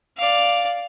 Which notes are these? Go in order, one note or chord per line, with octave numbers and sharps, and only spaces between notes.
D5 F5